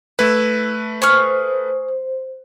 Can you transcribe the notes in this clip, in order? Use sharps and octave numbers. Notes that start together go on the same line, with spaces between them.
A3 E4 B4
G#4 C5 C#6 F6